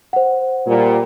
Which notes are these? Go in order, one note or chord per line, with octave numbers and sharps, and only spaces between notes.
C5 F#5
A#2 G3